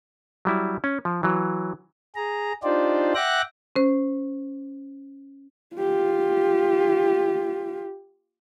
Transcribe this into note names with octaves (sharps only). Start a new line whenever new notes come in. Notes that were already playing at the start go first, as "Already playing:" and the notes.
F#3 G3 E4
C#4
F3
E3 F#3
G#4 A#5
D4 D#4 F4 G4 C5 D5
E5 F#5 G5 D6 F#6 A#6
C#4 C5
F4 G4